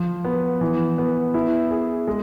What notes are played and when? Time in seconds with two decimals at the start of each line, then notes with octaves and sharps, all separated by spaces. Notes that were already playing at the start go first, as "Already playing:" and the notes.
Already playing: F3
0.25 B3
0.61 E3
0.98 B3
1.34 E4
1.71 G#4
2.08 G#3